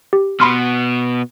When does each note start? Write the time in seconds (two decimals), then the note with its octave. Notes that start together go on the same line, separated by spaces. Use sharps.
0.13 G4
0.40 B2 B3 B5 C6 F6